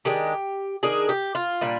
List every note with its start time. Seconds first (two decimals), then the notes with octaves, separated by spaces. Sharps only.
0.05 D#3 G#3 D4 G4
0.83 D#3 G#3 D4 G#4
1.09 G4
1.35 F4
1.61 A#2 G3 D4